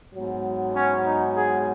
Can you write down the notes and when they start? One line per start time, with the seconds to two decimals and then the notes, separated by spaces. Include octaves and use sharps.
0.13 G#2 F#3 B3
0.74 C#4
1.05 D#4
1.36 G#4